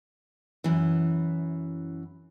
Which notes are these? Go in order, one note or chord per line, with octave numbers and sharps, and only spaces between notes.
F#2 E3